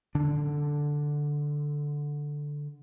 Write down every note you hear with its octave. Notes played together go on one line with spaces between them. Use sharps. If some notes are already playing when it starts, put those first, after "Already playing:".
D3 D4